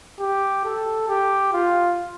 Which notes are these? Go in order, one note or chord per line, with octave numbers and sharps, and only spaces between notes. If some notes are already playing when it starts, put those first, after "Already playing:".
G4
A4
G4
F4